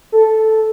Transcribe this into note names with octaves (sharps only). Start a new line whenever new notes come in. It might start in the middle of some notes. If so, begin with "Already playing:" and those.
A4